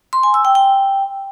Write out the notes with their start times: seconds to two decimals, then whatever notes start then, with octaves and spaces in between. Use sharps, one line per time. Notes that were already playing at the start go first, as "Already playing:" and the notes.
0.13 C6
0.23 G#5
0.34 E6
0.45 G5
0.55 G5